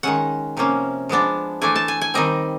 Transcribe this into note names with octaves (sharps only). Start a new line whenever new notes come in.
D#3 G#3 C#4 F#5
C3 F3 A#3 C#4
F3 G#3 B3 D4
E3 A3 D4 G#5
A5
G#5
G#5
D#3 G3 C4 D#5